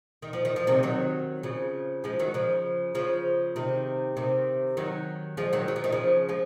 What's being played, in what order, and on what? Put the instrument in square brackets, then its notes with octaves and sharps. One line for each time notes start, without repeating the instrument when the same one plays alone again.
[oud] D#3
F3
D#3
F3
C3 D#3
D#3 F#3
C#3 F3
F3 G#3
D#3 F#3
C#3 F3
C#3 F3
C3 D#3
C3 D#3
D#3 F#3
F3 G#3
D#3 F#3
F#3
F3
D#3
C#3 F3
F3 G#3